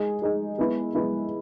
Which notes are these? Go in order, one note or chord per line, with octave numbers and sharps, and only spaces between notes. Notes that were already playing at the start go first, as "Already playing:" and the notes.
Already playing: G#3 D#4 G#4
G#3 D#4 G#4
G#3 B3 E4 B4
G#3 B3 E4 B4